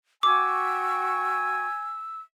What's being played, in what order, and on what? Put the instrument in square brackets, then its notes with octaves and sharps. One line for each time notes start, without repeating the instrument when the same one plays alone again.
[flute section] F#4 G5 C#6 [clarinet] G#5 [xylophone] D6 [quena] E6